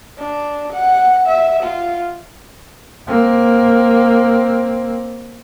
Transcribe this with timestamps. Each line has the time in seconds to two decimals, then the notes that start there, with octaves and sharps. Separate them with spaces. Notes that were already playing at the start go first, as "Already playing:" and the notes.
0.18 D4
0.73 F#5
1.27 E5
1.63 F4
3.08 A#3 C4